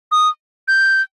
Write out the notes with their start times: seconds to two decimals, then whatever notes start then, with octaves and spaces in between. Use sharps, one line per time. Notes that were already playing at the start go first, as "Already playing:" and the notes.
0.12 D#6
0.68 G6